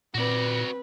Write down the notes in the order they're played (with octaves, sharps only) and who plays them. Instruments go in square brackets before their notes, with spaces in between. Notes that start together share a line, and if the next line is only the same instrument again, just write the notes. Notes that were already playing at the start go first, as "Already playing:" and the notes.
[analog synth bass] A#2 [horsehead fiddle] C4 B4 [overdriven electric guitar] F#4 D5